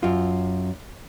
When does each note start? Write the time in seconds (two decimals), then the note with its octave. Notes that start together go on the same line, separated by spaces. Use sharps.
0.03 F#2 F4